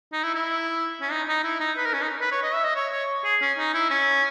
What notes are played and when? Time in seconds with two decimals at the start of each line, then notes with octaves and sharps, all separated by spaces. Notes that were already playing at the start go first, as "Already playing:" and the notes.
0.12 D#4
0.23 E4
0.34 E4
1.01 C#4
1.11 D#4
1.28 D#4
1.44 E4
1.60 D#4
1.77 B4
1.85 A#4
1.93 C#4
2.02 D#4
2.20 B4
2.31 C#5
2.43 D#5
2.53 E5
2.64 D#5
2.75 C#5
2.92 C#5
3.24 G#4
3.41 C#4
3.58 D#4
3.74 E4
3.90 C#4